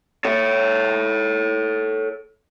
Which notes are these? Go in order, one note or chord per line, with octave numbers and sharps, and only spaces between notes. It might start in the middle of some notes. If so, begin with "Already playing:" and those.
A4 C#5